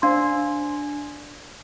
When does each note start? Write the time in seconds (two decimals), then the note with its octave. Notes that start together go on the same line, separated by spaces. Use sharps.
0.02 D4 C5 F5 C6